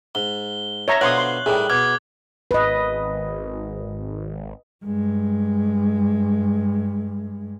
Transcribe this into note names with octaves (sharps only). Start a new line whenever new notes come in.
G#2 G7
C#5 E5 A#5
B2 D3 F3 C#5 C6 D#6 F#6 F#7
C6
A2 D#3 G3 G#4
B2 D6 F6 G#6
G#1 B4 D#5
G2 G#3